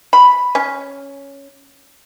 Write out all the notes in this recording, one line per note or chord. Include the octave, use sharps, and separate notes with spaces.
B5
C#4